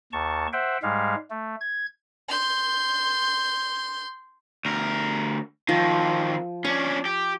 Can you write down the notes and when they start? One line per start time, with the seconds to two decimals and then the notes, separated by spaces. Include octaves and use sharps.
0.13 D#2 A5 C#6
0.53 C5 E5 F#5 G5
0.83 G#2 G3 G#3 F5
1.30 A3
1.61 G#6
2.29 C6 G6
4.65 D2 A#4
5.69 D#3 F3 C4
6.65 C#4 D4 C#6
7.05 G4